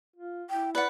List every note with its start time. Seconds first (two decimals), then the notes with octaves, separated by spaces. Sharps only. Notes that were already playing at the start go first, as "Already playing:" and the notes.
0.16 F4
0.50 E4 G5
0.75 B4 D5 F#5